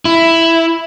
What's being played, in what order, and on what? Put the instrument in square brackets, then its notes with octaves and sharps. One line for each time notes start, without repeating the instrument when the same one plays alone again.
[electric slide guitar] E4